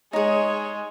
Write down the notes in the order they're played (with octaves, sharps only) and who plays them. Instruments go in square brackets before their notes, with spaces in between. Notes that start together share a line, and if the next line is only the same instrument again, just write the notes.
[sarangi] G#3 [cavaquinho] D#4 G#4 [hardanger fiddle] C#5